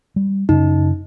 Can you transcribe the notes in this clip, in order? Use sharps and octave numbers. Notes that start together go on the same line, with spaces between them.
G3
F#2 C#3 C#4 D#4